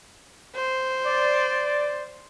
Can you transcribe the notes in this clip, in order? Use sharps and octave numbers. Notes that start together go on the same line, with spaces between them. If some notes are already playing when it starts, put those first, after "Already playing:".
C5
D5